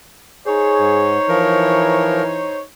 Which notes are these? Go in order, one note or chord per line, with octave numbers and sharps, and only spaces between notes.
D#4 G#4 C5 C#5
G#2
E3 F3 A#4